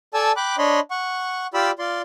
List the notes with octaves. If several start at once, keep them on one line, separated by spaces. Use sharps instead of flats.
A4 D5 G#5 A5 E6
G5 B5 D6 F#6
D4 C#5 D#5 B5 C6
F#5 C#6
F4 G4 D5 B5 E6
F4 D5 C6